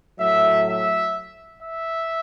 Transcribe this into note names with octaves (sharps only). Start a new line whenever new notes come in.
A2 F#3 E5
E5
E5